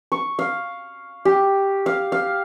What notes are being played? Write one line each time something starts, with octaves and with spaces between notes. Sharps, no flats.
C#6
F5
G4
F5
F5